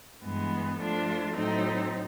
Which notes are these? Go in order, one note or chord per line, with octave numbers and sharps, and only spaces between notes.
G2 E3 G#3 B3
F3 A3 D4 F4
A2 F#3 A3 C4 D#4